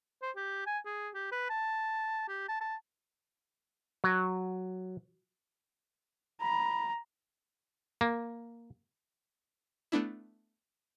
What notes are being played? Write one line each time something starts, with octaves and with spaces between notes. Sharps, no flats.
C5
G4
G#5
G#4
G4
B4
A5
G4
A5
A5
F#3
A#5 B5
A#3
A3 B3 D4 E4